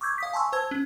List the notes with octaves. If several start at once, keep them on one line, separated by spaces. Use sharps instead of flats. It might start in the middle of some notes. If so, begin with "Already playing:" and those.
C#6 D6 E6 G6 G#6
F5 D#6 B6
G#5 A5 C6 C#6 E6
C5 A5 E6 G#6
C#4